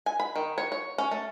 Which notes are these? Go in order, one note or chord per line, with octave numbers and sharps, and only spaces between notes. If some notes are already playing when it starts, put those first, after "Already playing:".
G#5
B5
D#3
C#5
C#5
C#4
A3